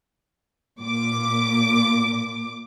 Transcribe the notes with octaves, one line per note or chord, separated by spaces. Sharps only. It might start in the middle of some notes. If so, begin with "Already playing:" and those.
A#2 D6